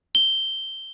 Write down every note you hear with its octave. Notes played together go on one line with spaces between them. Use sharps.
G7